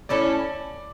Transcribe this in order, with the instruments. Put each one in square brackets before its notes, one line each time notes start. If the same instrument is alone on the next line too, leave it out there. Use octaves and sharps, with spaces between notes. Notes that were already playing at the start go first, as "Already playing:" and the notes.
[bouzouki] A3 C#4 E4 A4 [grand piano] D5